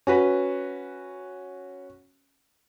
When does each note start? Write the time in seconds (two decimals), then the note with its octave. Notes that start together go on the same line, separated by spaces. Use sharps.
0.07 C#4 F#4 B4